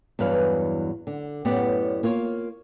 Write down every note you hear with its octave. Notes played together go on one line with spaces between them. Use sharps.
E2 G2 E3 F#3 B4 F5
D3
F#2 A2 B3 G4 D5
A#3 F4 C#5